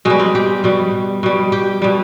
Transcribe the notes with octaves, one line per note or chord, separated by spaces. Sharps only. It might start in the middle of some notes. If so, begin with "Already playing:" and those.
B2 G3 G#3
C4
G4
B2 G3
B2 G3
G4
B2 G3